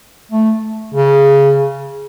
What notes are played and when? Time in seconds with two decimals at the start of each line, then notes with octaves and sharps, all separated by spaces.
0.32 A3
0.94 C#3